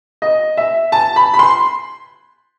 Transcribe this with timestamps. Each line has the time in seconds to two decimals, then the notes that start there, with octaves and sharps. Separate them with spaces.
0.22 D#5
0.57 E5
0.92 A5
1.16 B5
1.34 B5
1.39 C6